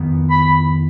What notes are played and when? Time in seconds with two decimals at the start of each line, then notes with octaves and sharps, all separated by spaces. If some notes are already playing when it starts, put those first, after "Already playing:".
Already playing: F2 D#3 B3
0.30 B5